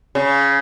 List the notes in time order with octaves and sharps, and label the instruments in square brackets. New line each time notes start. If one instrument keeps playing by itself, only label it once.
[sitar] C#3